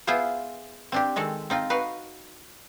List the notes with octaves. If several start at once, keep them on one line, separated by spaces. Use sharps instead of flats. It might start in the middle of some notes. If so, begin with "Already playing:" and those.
B3 E4 F4 G#4 C5
C4 D4 G4
D#3 G#3 C4 A4
C4 D#4 F4
D#4 F#4 B4 F5